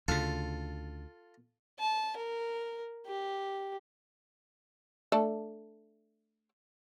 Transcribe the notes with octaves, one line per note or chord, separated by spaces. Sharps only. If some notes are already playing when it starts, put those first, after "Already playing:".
D2 C#3 F4 A4
A5
A#4
G4
A3 D4 A4